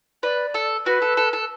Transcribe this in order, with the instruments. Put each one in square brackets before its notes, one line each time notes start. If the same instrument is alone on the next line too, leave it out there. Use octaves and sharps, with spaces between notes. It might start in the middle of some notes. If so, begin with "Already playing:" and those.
[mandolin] B4 [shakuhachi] D5
[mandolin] A4
[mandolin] F#4 [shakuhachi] B4
[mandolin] A4
A4
A4